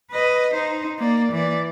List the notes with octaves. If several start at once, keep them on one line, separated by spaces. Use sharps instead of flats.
B4 D#5
D#4 C5
A#3 D5
E3 D5